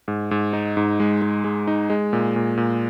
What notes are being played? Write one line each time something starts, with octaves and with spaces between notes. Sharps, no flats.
G#2
G#2
D#4
G#2
G#3
G#3
G#3
D#4
G#3
A#2
A#2
A#2